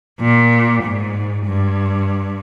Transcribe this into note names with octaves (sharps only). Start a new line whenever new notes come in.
A#2
G#2
G2